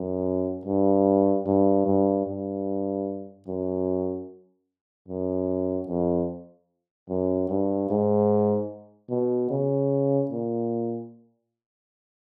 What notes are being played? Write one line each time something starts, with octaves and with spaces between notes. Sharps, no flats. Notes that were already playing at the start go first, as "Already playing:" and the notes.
Already playing: F#2
G2
G2
G2
G2
F#2
F#2
F2
F#2
G2
G#2
B2
C#3
A#2